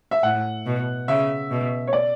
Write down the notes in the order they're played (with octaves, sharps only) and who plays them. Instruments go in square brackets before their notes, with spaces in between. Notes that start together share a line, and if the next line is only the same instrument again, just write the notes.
[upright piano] E5
[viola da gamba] A2 [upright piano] F#5
[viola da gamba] B2
[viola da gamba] C#3 [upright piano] E5
[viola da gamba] B2
[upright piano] C#5
D5